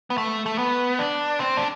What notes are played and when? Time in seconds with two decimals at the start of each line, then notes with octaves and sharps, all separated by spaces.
0.10 B3
0.18 A3
0.46 A3
0.58 B3
0.99 D4
1.40 C4
1.57 D4